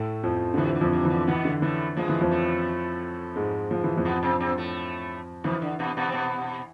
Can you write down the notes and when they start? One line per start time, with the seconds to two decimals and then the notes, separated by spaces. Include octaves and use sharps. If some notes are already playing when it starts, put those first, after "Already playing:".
Already playing: A2 A3
0.23 F2 F3
0.54 D3
0.57 C3 E3
0.75 D3
0.81 F2 F3
0.93 C3
1.05 E3
1.10 D3
1.27 B2 E3 B3
1.45 D3
1.62 A2 E3 A3
1.97 G#2 F3 G#3
2.09 E3
2.21 F2 F3
2.31 A2 A3
3.36 G#2 G#3
3.71 F3
3.84 E3
3.97 F2 F3
4.05 B2 B3
4.23 C3 C4
4.40 C3 C4
4.57 A2 A3
5.44 F2 E3 F3
5.62 D3
5.79 B2 B3
5.97 B2 B3
6.09 C4
6.14 B2 B3